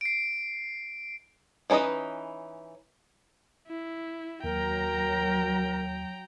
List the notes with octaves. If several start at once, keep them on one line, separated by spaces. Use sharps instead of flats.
C7 D7
E3 C#4 D#4 B4 D#5
E4
D#2 F#3 A#4 G5 A#5